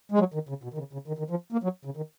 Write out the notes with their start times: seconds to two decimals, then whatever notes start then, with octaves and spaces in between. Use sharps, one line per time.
0.12 G#3
0.19 F#3
0.34 D#3
0.49 C#3
0.63 B2
0.74 D#3
0.78 C#3
0.93 C#3
1.08 D#3
1.19 D#3
1.30 F3
1.52 A#3
1.63 F#3
1.85 C#3
1.97 D#3